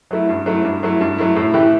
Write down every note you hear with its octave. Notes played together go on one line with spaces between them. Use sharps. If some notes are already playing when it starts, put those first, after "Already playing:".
F#3 A3 E4
G2
F#3 A3 E4
G2
F#3 A3 E4
G2
F#3 A3 E4
A2
E3 A3 E4 G4